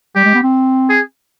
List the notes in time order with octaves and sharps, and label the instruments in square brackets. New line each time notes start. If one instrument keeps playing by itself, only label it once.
[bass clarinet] G3 [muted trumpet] G4
[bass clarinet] G#3
B3
C4
[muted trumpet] G#4